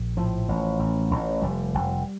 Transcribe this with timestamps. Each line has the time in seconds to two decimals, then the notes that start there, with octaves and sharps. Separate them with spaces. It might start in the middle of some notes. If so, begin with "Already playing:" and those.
Already playing: A#1
0.17 A2 F3
0.48 A1
0.79 A1
1.11 A1
1.42 F1 G3
1.74 F1